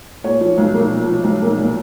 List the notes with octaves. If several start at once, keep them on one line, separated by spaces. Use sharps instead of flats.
A#2 C#5
F3
B1
A#3
A#2
F3
B1
A#3
A#2